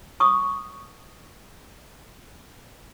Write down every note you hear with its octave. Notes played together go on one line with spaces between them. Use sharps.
C#6 D#6